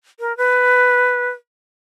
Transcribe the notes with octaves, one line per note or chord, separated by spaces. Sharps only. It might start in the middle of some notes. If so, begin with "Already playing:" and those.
A#4
B4